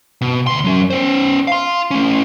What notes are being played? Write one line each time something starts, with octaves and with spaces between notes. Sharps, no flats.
B2
D2 C6
F#3 C#4
C#4 C5
F5 C6
A3 C#4